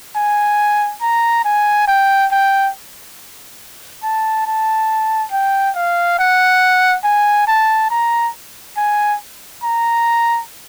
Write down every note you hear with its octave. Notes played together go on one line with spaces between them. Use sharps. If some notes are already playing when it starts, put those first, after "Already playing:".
G#5
A#5
G#5
G5
G5
A5
A5
G5
F5
F#5
G#5
A5
A#5
G#5
A#5